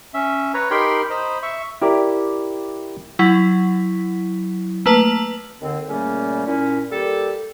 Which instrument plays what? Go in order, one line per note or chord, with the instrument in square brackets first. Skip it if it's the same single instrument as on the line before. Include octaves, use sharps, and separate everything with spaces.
[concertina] C#4 E5
B4 C#5 A#5
D#4 G4 A#4 G5 B5 C6
C5 D#5 A#5 B5
E5 C#6
[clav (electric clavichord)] E4 G4 A#4 D5
[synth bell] F#3 E4
A3 A#3 B4 A5
[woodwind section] D#2 D3 C4
A#2 C#3 G3 A3 A#3 C#4
A#2 C#4 E4
G3 A#3 G4 A4